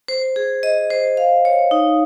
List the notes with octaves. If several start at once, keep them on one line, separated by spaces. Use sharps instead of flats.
C5
G#4
D#5
C5
F5
C#5
D#4